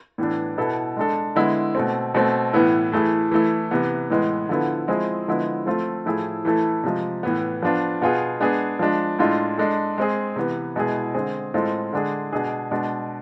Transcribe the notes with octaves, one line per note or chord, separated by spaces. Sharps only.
A2 E3 B3 D4
B2 B3 E4 A4
G#3 D4 A4
D3 G#3 B3 E4
B2 A3 C4
B2 A3 C4
A2 E3 B3 E4
E3 A3 E4 G#4
E3 A3 E4
C3 E3 B3
A2 E3 G#3 B3
D3 F3 B3 E4 A4
F3 G#3 C4 E4 G#4
D3 F3 G#3 B3 E4
F3 A3 C4 F4
A2 F3 A3 E4 G#4
E3 A3 E4 A4
C3 F3 G#3
A2 E3 B3
F3 B3 D4 F4
B2 B3 F4 G#4
G#3 B3 D4 G#4
F3 G#3 D4
A2 G#3 D4 F4
G#3 D4 A4
G#3 C4 G#4
C3 E3 B3
B2 G#3 B3 E4 G#4
D3 G#3 C4 G#4
A2 G#3 C4 F4 A4
D3 G#3 D4 G#4
B2 G#3 D4 G#4
B2 G#3 D4